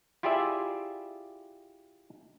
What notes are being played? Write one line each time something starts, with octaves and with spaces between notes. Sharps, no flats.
E4 F4 G4 G#4 D5 E5